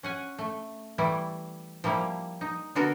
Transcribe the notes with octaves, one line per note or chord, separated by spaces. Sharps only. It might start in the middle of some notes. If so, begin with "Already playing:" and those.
C#4 F#5 G#5
A3
E3 G3 A3 E4
F3 G3 A#3 E4
D#4
D3 B3 F#4 A4 A#4